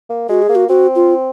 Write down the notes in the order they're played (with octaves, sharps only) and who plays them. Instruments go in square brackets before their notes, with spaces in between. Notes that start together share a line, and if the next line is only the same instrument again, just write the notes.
[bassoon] A#3
[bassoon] G#3 [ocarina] F#4
[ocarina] G#4
[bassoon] A#3
[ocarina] F#4
[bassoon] C4 [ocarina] F#4
[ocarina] F4